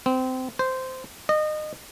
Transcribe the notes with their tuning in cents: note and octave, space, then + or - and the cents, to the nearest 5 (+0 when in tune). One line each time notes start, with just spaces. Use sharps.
C4 -20
C5 -10
D#5 -25